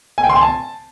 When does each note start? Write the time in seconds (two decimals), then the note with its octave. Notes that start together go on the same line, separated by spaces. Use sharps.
0.18 G#5
0.24 G5
0.30 C6
0.35 G#5
0.41 A5